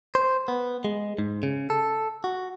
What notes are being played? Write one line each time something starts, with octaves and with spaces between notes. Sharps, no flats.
C5
B3
G#3
G#2
C#3
A4
F#4